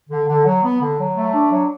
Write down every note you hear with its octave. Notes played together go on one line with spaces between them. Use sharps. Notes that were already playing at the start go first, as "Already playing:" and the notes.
D3
D3
F#3
B3
D3
F#3
A3
D4
F#3